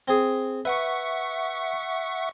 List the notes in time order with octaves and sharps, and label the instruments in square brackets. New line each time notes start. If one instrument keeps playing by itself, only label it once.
[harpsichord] C4 G#4
[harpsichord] B4 [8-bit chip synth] E5 F#5 C#6